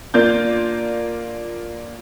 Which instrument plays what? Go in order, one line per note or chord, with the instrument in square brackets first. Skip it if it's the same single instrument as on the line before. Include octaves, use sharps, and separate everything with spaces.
[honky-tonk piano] A#3 D4 F4 G6